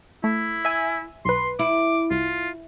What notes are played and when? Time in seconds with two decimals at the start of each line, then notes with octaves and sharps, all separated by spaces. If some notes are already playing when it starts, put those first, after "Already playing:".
0.24 A3 E4
0.65 E5 G#5
1.25 B1 B4 C6
1.59 E4 D6
2.11 C2 F4